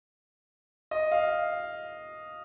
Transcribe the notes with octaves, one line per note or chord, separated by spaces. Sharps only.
D#5
F5